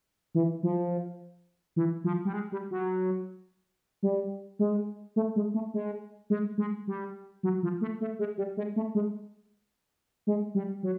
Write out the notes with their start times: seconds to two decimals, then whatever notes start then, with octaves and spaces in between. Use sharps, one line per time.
0.35 E3
0.63 F3
1.76 E3
2.04 F3
2.25 G3
2.34 G#3
2.52 G3
2.71 F#3
4.03 G3
4.59 G#3
5.16 A3
5.36 G#3
5.54 A3
5.74 G#3
6.30 G#3
6.58 G#3
6.87 G3
7.43 F#3
7.63 F3
7.81 A3
8.01 A3
8.19 G#3
8.37 G3
8.57 G#3
8.76 A3
8.95 G#3
10.27 G#3
10.55 G3
10.83 F#3